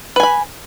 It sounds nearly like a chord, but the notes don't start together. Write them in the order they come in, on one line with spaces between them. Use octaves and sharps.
B4 G#5 B5